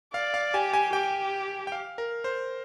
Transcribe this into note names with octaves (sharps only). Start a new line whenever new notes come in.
D5 F5
F5
G4 G#5
G#5
G4 G5
G5
F5
A#4
C5